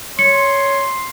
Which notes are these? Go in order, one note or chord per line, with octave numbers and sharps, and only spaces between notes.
C#5 C6 C#7